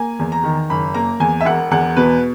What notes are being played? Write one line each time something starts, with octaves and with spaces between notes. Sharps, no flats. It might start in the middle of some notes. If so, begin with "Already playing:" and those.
Already playing: A#3 G#5
E2
A#5
D#3
F#1 B5
A#3 A#5
E2 G#5
E5
E1 F#5
E2 F#5
B2 B4